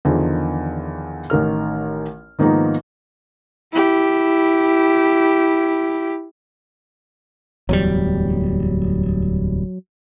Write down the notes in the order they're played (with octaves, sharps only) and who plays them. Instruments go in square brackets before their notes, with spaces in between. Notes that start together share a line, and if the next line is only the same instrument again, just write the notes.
[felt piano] E2 D3 D#3 F3
A1 D#3 A#4 F6
G#2 D#3 F3 A#3 B3 D#4
[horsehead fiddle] E4 G4
[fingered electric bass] D1 E2 G3 [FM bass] F#3